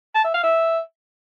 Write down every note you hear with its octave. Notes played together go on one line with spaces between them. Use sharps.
A5
E5
F5
E5